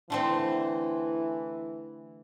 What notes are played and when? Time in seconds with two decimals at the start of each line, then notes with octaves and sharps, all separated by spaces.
0.10 D3 E3 A3 C4